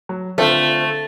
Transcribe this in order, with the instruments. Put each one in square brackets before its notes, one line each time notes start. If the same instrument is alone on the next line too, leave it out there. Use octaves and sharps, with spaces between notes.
[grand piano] F#3
[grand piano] D3 C4 F4 [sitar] A3